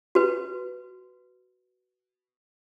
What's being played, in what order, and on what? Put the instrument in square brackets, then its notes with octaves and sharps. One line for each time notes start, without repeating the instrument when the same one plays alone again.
[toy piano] F#4 B4